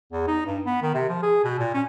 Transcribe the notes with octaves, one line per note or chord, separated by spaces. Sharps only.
E2
D#4
G2
B3
D#3
C3
F3
G#4
B2
A#2
C#4